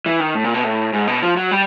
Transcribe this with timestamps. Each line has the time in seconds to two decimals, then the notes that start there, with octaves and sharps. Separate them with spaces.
0.06 E3
0.20 D#3
0.35 A2
0.44 A#2
0.54 B2
0.64 A2
0.93 G#2
1.07 B2
1.22 F3
1.37 F#3
1.51 G3